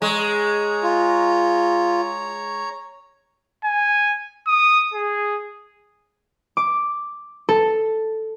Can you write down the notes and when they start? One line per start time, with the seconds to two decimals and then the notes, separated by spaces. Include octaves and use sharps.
0.02 G#3 C#5 A#5
0.83 F4
3.65 G#5
4.47 D#6
4.94 G#4
6.57 D6
7.49 A4